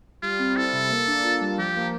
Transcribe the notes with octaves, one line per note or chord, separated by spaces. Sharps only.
G3 F4
C4
E4 A4
C3
A#3
D4
F4
G3
F3 G4
A#3